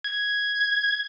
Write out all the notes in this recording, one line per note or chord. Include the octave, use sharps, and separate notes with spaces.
G#6